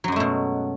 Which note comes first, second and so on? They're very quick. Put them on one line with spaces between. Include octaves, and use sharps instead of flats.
F#3 F#2 G#3 A3 B2